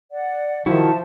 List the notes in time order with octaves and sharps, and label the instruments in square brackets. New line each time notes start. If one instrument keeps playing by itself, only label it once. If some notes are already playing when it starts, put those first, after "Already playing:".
[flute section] D5 F#5
[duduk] D#3 [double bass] F3 [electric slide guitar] E4 F#4 [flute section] E5 A5